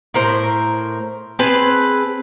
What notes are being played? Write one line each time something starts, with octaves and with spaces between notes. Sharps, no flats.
A2 A#4 C5
C4 G#4 B4 A5